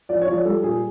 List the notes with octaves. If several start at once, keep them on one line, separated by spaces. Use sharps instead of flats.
F3 D5
C#5
F3
D5
G3 A4
A#2 G#4